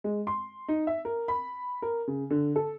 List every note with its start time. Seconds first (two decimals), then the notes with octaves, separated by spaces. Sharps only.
0.04 G#3
0.27 C6
0.68 D#4
0.87 E5
1.05 A#4
1.28 B5
1.82 A#4
2.08 C#3
2.30 D3
2.56 A4